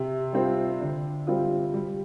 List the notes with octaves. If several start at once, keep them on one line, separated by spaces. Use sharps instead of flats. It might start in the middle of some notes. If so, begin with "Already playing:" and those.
Already playing: C3
G3 C4 F4
D3
G3 C4 F4
G3